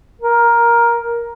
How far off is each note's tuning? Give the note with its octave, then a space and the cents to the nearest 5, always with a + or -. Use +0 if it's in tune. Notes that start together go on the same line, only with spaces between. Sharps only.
A#4 +10